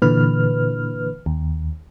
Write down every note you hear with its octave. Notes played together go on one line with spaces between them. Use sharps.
A#2 D3 E3 B4 F6
D#2